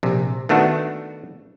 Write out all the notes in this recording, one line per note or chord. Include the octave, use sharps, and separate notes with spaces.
A#1 C3
D#3 A3 B3 D4 F#4